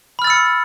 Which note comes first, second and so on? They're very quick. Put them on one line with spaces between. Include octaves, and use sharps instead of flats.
B5 F6 A6 E6 C#7